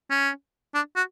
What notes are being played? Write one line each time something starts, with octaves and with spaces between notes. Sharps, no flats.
C#4
D4
F#4